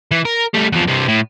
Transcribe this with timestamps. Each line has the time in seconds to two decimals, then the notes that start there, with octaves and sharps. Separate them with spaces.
0.11 E3
0.25 A#4
0.54 G3 A3
0.72 E2 F3
0.88 G2 C3
1.08 A2